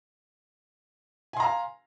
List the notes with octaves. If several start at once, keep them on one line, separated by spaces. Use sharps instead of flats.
F5 G#5 A#5 C6